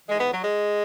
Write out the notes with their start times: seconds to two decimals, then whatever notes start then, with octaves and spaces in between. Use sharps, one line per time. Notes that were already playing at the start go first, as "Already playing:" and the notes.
0.09 G#2 E3 G#3
0.20 B3
0.31 F#3
0.41 G#3